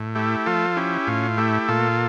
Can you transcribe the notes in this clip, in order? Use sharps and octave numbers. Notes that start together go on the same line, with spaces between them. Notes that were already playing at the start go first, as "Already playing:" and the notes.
Already playing: A2
A3 E4 G4
F3 F4 A4
C#4 E4 G4
A2 F4
A3 E4 G4
A#2 F4 A4